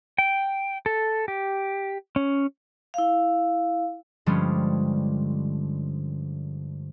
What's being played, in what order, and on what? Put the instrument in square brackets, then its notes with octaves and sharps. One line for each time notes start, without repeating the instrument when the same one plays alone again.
[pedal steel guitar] G5
A4
G4
C#4
[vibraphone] E4 F5
[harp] G2 D3 F3 G3 G#3 C#4